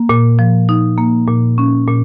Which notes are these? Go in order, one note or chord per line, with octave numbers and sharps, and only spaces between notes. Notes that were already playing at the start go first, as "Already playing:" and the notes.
Already playing: A#3
A#2
F3
D#4
A#3
A#2
C#4
A#2